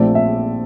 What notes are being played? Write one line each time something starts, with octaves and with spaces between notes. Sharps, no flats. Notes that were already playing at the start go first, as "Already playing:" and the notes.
Already playing: A#1 A#2 A3 C4 D5
E5